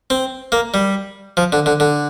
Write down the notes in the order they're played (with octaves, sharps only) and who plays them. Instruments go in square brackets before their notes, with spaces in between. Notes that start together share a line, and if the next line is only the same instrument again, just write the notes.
[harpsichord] C4
A#3
G3
F3
D3
D3
D3